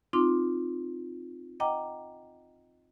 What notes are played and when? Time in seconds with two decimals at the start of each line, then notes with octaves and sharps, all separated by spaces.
0.13 C4 D#4 F4 C6 D6
1.60 D#5 F#5 G5 A#5 D6